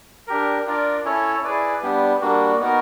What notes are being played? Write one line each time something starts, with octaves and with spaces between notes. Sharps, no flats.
D4 G4 A#4
D4 F4 A#4 D5
C#4 E4 A4 C#5
E4 G#4 B4 D5
G3 B3 D4 G4
G3 A#3 D4 F#4
B3 D#4 F#4 A#4